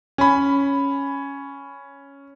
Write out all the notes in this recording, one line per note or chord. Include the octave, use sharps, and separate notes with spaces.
C#4 B5